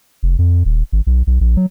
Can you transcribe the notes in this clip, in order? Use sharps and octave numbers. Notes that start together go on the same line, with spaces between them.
F1
F2
D#1
G#1
B1
B1
A#1
F#3